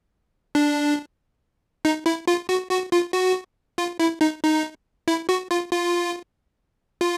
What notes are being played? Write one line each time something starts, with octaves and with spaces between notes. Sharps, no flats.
D4
D#4
E4
F4
F#4
F#4
F4
F#4
F4
E4
D#4
D#4
E4
F#4
F4
F4
F4